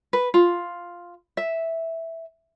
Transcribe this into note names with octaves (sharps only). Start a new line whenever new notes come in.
B4
F4
E5